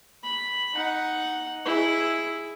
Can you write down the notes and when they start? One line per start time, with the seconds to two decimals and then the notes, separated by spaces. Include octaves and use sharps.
0.24 B5
0.74 D#4 F#5
1.65 E4 G#4